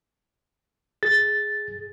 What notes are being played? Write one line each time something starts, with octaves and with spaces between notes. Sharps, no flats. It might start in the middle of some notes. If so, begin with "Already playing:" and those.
G#4 A6